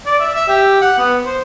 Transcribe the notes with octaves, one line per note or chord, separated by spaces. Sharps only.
D5
E5
E5
G4
F#5
B3
C5